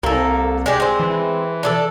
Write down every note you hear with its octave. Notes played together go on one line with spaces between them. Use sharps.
C2 A#3 A4
G#3 D4 G4
G#3 C4
E3
D4 G#4 A4